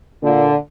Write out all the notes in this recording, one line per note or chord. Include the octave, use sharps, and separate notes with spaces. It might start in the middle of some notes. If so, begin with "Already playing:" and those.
A#2 D3